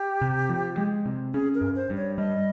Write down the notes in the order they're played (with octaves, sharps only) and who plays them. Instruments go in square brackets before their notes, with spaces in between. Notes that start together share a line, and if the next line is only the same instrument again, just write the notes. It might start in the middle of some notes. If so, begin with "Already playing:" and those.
Already playing: [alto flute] G4
[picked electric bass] C3
F3
G#3
C3
[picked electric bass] C#4 [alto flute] G#4
[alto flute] A#4
[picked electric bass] G2
[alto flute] C5
[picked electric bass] G2
[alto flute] C#5
[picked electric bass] G3 [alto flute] D#5